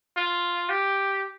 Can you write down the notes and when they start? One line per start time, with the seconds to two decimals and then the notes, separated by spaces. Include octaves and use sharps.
0.17 F4
0.70 G4